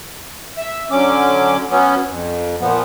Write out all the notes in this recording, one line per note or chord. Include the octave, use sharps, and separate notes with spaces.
E5 E6
D3 F#3 C#4 D6
F#3 B3 C#4
F2
A#2 F3 B3